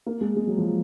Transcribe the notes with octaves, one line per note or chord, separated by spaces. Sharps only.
A#3
G#3
G#3
F#3
F3